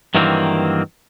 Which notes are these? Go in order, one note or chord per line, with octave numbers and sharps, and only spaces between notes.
G2 D#3 E3 F#3 A#3 C4